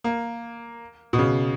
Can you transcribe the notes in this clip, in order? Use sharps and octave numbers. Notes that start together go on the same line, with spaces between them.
A#3
B2
C#3